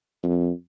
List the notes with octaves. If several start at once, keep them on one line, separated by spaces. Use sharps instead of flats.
F2